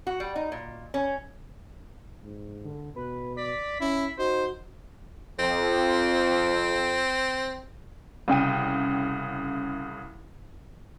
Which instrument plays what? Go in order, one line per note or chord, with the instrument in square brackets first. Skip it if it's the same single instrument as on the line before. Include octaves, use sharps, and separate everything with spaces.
[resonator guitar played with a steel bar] F#4
G3
D#4
A#2
C#4
[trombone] G#2
[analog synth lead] D3
[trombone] B2 [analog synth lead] B4
[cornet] D5 [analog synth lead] B6
[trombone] C#4 [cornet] E4
[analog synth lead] D#4 [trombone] F#4 [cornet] C5
[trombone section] F2 [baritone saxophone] C4
[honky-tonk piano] C2 C#3 G5 D#7